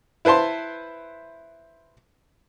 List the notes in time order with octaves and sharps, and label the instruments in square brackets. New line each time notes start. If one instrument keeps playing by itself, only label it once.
[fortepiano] E4 B4 C5 A5 C6